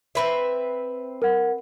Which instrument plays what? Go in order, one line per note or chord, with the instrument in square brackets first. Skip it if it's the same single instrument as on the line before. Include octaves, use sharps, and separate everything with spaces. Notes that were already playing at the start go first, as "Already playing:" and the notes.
[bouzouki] C4 B4 E5
[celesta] A#4 F#5